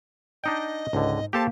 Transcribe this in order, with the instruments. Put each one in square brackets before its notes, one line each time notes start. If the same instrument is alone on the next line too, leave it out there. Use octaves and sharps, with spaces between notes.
[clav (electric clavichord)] D4 D#4 G5 [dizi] D#5
[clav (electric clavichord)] C#2 D3 [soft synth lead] G#2
[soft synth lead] A#3 [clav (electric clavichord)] G4 A4 C5 [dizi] A5